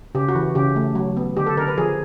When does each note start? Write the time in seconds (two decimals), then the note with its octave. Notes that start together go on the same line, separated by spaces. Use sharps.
0.15 C#3 G4
0.29 F#4
0.35 E3
0.55 C#3 G4
0.76 A3
0.95 F#3
1.17 B3
1.37 D3 G4
1.47 A4
1.57 D3 A#4
1.68 B4
1.78 F3 G#4